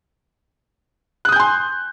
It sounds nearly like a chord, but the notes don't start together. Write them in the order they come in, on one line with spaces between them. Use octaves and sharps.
F#6 D#6 G6 G#5 C6